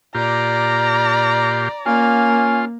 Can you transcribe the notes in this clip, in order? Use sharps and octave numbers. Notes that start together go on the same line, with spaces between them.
A#2 F4 G4 D5 A#5
A#3 C#4 F4